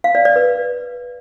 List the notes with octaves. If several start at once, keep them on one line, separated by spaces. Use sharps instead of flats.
F5
D5
D5
B4